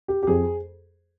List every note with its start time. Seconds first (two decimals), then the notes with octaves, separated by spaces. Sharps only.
0.08 G4
0.23 G4
0.27 F2 G#4